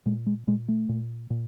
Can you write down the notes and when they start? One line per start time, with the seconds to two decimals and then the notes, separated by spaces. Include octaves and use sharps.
0.06 A#2 G#3
0.26 G#3
0.47 A#2 G#3
0.68 A3
0.89 A#2
1.30 A#2